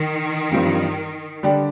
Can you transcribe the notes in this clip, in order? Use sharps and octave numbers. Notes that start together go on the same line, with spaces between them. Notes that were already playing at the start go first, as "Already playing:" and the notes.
Already playing: D#3
G2 F3 C4 G4
D3 G3 D4 G4